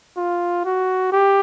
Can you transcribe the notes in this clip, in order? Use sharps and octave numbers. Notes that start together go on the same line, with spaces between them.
F4
F#4
G4